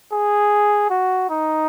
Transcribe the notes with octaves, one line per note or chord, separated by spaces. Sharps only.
G#4
F#4
D#4